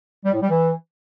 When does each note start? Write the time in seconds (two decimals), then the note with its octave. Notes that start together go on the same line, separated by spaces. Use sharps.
0.24 G3
0.32 A2
0.40 G3
0.48 E3